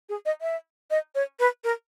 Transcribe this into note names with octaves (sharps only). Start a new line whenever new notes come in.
G#4
D#5
E5
D#5
C#5
B4
A#4